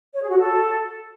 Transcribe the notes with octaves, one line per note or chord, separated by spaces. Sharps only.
C#5
G#4
F#4
A4